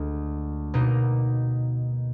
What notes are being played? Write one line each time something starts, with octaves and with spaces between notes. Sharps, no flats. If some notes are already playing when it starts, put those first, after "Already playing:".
Already playing: D2 D3 G#3
B2 A#3 D#4